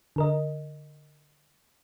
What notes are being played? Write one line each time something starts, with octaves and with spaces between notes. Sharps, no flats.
D3 A#4 D#5